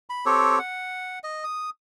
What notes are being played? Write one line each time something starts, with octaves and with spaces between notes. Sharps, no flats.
B5
C4 G4 A4 C#5
F#5
D#5
D#6